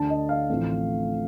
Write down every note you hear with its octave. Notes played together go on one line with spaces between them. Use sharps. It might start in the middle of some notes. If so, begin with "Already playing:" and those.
Already playing: D2 D3 A3 D4 A5
D#5
F5
A1 A2 F3 A3 C4